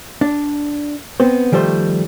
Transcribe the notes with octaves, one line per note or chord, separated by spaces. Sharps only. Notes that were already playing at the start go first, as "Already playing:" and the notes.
D4
B3 C4 C5
D#3 F3 G3 A3 C5